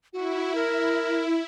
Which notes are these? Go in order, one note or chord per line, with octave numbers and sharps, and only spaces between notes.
E4 F#4
A#4